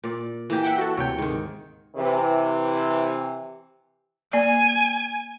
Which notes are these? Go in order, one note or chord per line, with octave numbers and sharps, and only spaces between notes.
A#2 D5
E3 A#3 G4
E5 F#5 G5
F#4 A4
D2 C3 C#5 G5
G#2 D#3
C3 E3
A#3 D5 G#5